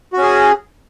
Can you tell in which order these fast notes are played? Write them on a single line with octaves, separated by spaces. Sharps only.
F#4 C#4 G#4